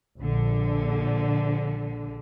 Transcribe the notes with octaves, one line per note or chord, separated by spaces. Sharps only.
A#1 D3